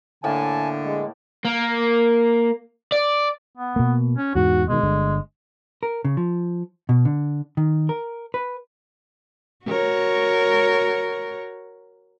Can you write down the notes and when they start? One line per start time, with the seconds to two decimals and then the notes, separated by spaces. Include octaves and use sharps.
0.24 A2 D3 A#3 G#5 A5
0.83 G#3
1.45 A#3
2.92 D5
3.57 B3
3.76 B2 A#3
4.16 C#4
4.35 E2 G#2 F#4
4.69 B2 D#3 G#3
4.83 G1 D3
5.83 A#4
6.05 C#3
6.17 F3
6.89 B2
7.05 D3
7.57 D#3
7.89 A#4
8.34 B4
9.66 F#4 A#4 C#5